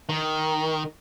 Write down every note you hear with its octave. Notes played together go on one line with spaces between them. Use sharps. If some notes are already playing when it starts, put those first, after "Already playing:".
D#3